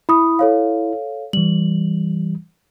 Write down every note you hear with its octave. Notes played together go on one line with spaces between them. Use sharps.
E4 B5 D#6
A4 C#5 F5
E3 G3 F#7